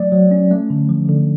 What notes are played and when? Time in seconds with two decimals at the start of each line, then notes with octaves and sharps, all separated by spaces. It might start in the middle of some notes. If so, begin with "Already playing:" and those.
Already playing: F#3 A3 D5
0.12 F#3
0.31 C#4
0.51 A3
0.70 D3
0.89 F3
1.09 D3